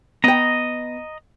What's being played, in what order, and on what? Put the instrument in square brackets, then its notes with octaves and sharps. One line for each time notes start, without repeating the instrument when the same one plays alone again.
[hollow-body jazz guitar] B3 G5 [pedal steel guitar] D#5 A#5